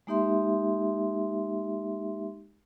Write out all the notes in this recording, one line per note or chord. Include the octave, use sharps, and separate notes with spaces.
G#3 A#3 D#4 G4 E5 C6